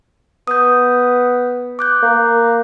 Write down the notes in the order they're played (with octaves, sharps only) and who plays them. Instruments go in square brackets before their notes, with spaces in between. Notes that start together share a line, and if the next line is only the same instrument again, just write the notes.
[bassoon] B3 [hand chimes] D#6 G6
[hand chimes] D6 F#6 G6
[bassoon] A#3